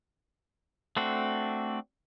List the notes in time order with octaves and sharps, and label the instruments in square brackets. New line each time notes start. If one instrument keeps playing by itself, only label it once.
[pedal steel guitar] A3 C4 D4 F#4